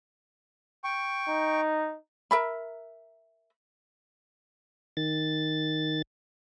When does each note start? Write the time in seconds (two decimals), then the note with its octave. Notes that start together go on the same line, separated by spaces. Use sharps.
0.84 G5 C#6
1.29 D#4
2.31 A#4 E5 B5
4.97 D#3 A6